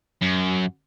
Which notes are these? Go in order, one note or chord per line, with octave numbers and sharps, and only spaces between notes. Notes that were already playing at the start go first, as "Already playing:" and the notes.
F#2